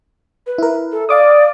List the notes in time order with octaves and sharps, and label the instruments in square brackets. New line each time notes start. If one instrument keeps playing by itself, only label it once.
[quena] B4
[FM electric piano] E4 A#4
[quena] A4
[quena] D5 [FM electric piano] F5 D6 D#6